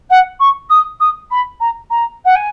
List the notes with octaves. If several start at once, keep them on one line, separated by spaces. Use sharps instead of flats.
F#5
C#6
D#6
D#6
B5
A#5
A#5
F#5
G#5